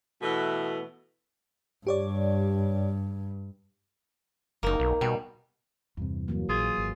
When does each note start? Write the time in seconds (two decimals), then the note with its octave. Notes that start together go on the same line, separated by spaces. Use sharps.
0.21 B2 E3 A3 B3
1.87 G2 G4 C#5 D5
4.63 F#1 A#3 D#4
4.80 B1
5.01 B2 G3
5.97 E2 G2 C3 E3
6.28 E3 F#3 A#3
6.49 A#1 F4 G#4
6.78 G#1